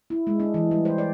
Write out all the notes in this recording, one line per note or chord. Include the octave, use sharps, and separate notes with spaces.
E4
G#3
D4
E3
G3
C5
D5